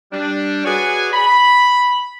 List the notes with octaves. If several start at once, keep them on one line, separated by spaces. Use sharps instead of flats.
G3 D4
F#4 G#4 B4 C#5 D5 G#5
B5